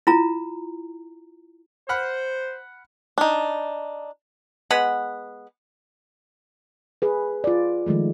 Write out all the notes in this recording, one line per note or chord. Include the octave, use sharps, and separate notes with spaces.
E4 F4 A#5
C5 F#5 B5 F6
D4 D#4
G#3 B3 F#5 B5
G#4 B4
F4 D5
D#3 F3 G#3 A3